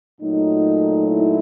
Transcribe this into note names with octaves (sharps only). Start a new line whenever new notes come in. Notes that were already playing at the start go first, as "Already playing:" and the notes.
A#2 F#3 A3 D#4
E4